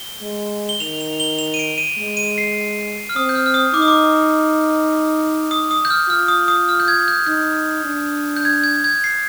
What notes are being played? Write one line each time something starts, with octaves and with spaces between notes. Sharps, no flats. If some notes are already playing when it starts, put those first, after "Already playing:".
Already playing: G7
G#3
G7
D#3 F7
F7
G7
F7
D#7
D7
D#7
G#3
D#7
C7
F6
C4 D#6
G6
F6
F6
D#6
D#4 D6
D#6
D6
D#6
D#6
G6
F6
F4 F6
D#6
D#6
F6
G6
G#6
G6
D#4 G6
D4
G6
G#6
G#6
G#6
C7